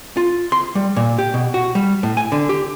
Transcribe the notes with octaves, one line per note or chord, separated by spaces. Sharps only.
F4
C6
G3
A#2
G4
B2
F#4
G3
A2
G#5
D3
G4